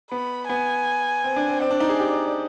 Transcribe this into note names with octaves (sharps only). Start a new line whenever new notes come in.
B3 B5
B3 G#5
C4
D4
C4
C4 D5
D4
D#4
G#4
G4